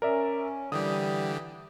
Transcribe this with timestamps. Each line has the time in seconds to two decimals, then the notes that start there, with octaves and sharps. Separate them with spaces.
0.02 C#4 A#4 D5 E5
0.72 D3 E3 G3 G4 D#6